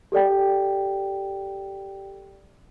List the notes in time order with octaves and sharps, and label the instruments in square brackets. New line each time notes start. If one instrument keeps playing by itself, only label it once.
[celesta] G4 A4 D5 G5